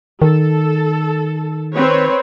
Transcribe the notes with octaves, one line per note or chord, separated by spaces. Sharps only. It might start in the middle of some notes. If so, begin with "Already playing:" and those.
D#3 A4
C4 B4 C#5